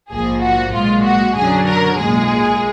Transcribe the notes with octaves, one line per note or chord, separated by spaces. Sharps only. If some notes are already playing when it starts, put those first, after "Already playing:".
A#1 G#2 F3 A#3 G#4
F#4
B1 A#2 G#3 F4
F#4
F#2 D3 F#3 G#4
A#4
B1 A#2 G#3 G#4